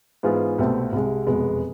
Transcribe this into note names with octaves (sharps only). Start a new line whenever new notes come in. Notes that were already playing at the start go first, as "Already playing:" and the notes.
G#2 E3 B3 F4 G#4
C2 B2 A3 C4
C2 C3 G#3
F1 E2 B2 G#3 B3